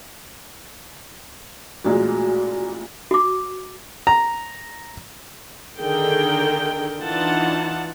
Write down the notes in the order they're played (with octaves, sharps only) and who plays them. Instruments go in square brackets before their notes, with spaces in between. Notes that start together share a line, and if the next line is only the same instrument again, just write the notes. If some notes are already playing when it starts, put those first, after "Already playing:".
[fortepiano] A1 A#2 G#3 [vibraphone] F#4
[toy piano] F#4 D6
[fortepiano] A#5
[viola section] D3 D#3 G#4 A#4 G5
E3 D4 D#4 F4 F#5 A5